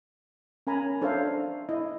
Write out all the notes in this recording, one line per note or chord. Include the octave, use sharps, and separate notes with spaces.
C#4 A#4 G#5 A#5 B5
D4 A4 C5 C#5 E5 F5
E4 D#5